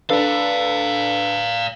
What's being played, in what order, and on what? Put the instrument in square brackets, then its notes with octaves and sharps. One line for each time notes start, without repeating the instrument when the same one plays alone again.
[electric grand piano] D4 A4 B4 [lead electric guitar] D5 F5